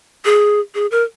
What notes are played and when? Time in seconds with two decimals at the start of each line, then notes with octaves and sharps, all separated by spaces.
0.25 G#4
0.75 G#4
0.91 A#4